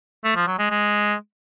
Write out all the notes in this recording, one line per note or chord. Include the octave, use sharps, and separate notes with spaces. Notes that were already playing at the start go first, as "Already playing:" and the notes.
A3
F3
F#3
G#3
G#3